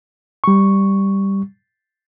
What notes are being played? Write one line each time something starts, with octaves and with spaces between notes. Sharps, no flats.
G3 C#6